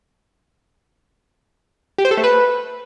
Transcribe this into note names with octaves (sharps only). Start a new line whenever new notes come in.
G4
C5
A4
A3
B4